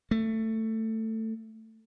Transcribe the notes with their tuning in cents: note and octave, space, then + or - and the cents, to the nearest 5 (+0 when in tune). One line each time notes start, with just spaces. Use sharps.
A3 +15